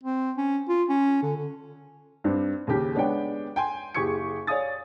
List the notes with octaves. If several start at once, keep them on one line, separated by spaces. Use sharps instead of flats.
C4
C#4
F4
C#4
D3
D3
G2 C4 D4
D#2 C#3 G4
G#3 B3 D4 C#5 G5
G5 G#5 C6
F#1 G4 G#4 C#6 G#6 C#7
C#5 D5 F5 G#5 D#6 A6